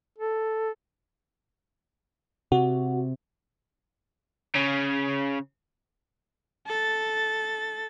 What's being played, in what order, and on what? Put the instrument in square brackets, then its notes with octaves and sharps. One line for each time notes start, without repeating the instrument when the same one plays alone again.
[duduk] A4
[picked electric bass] C3 [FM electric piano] F#4
[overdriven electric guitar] C#3 C#4
[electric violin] A4 A6